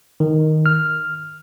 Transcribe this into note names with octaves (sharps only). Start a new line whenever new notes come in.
D#3
F6